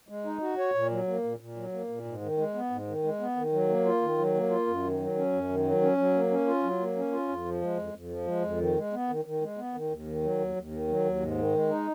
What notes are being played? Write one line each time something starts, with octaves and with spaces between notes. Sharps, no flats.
G#3
D#4
F#4
C#5
A#2
F#3
A#3
A#2
A#2
F#3
A#3
A#2
G#2
D#3
G#3
B3
G#2
D#3
G#3
B3
D#3
F#3
A#3
F4
D#3
F#3
A#3
F4
F#2
D#3
F#3
C#4
F#2
D#3
F#3
C#4
F#3
A#3
C#4
F4
F#3
A#3
C#4
F4
F2
F3
G#3
F2
F2
F3
G#3
F2
D#3
G#3
B3
D#3
D#3
G#3
B3
D#3
D#2
D#3
F#3
D#2
D#2
D#3
F#3
D#2
G#2
D#3
G#3
D#4